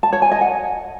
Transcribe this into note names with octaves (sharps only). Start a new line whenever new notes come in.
A5
C#5
G#5
D#5
F#5